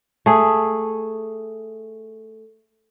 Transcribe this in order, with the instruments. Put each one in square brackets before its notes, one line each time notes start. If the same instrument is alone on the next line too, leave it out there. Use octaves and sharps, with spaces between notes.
[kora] A3 G#4